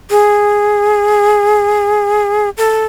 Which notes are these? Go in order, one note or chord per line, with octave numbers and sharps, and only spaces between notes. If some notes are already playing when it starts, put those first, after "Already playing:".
G#4
A4